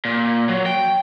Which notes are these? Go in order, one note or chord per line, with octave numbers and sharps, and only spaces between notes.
A#2
F#3
G5